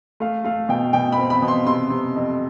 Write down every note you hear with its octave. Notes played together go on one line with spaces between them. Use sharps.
A3 F5
A3 F5
B2 G5
B2 G5
B5
C4
B5
B2
C6
C3 C6
C3
F2